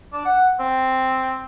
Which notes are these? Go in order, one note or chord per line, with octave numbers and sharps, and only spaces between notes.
D4
F#5
C4